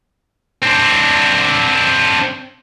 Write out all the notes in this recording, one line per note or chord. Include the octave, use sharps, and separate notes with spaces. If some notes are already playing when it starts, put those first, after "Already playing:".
C4 D4